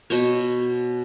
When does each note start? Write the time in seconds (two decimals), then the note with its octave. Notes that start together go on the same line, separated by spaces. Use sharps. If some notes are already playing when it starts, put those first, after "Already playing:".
0.10 B2 C5 C#5